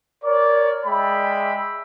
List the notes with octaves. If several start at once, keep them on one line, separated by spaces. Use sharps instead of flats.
A#4 C#5 D5
G#3 D5 E5 G5 B5